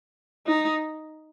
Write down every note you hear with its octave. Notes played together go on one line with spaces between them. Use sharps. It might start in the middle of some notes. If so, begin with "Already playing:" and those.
D#4